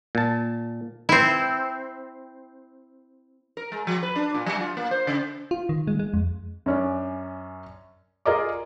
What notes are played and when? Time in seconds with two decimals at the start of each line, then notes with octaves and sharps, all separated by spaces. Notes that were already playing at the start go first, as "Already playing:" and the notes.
0.15 A#2 A5
1.09 C4 E4
3.57 A#4
3.72 G#3
3.87 F3
4.03 B4
4.16 D4
4.34 A#2
4.46 F#3
4.60 F4
4.77 A#3
4.91 C5
5.07 C#3
5.51 F4
5.69 D#3
5.87 G#3
5.99 G#3
6.14 F2
6.66 F#2 C#4 D4
8.26 F4 G#4 A#4 D5 D#5 D6